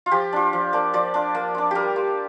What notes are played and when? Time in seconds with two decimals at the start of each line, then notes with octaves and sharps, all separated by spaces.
0.06 F4
0.11 F3 G4
0.33 D4 F4
0.53 F3
0.73 A#3 D4
0.93 F3 D5
1.14 D4 F4
1.35 A#3
1.55 D4 F4
1.71 G3 G4 A#4
1.96 A#3 F4